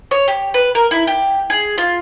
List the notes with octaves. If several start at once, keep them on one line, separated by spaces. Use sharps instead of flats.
C#5
G4
B4
A#4
E4
G4
G#4
F4